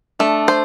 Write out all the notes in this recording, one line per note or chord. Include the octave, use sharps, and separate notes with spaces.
A3 D4
C5